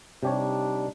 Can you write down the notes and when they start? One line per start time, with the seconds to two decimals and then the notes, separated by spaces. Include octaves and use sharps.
0.23 C3 G3 D4 D#4 G4 C#5